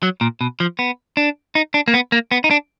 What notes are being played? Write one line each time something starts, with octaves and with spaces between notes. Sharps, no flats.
F#3
A#2
B2
F3
B3
D4
D#4
D4
A#3
B3
A#3
B3
D#4
D4